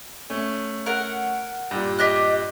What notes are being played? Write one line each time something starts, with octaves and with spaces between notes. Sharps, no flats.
A3 C#4
A#4 F#5
G2 A#2
G4 D#5 F#6